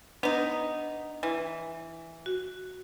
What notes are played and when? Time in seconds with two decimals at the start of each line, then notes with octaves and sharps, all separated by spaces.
0.23 B3 D4 D#4
1.23 E3
2.26 F#4